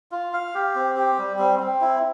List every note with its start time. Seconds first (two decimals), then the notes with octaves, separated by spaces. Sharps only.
0.12 F4
0.33 F5
0.55 G4
0.75 C4
0.96 G4
1.18 G3
1.39 C4
1.60 C4
1.81 E4